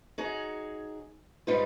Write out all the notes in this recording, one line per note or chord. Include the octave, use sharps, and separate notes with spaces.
D#4 F#4 G#4 C#5
G#2 G3 D#4 F4 G4 B4